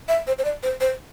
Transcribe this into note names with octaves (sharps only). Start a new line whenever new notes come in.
E5
C5
C5
D5
C5
C5